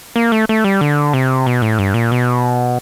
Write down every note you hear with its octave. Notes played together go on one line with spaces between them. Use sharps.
A#3
A3
A3
G3
D3
C3
B2
A2
G2
A#2
B2